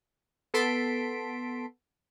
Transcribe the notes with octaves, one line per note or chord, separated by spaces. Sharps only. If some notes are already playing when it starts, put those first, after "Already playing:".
B3 A4 A5 C6 B6 D7